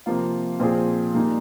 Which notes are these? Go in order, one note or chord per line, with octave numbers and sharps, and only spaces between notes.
C3 F3 A#3 F4
A#2 F3 C4 F4 G#4
A#2 G3 A#3 D#4